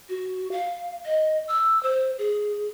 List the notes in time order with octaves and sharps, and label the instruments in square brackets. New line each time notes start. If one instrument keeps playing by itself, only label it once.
[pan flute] F#4
F5
D#5
E6
C5
G#4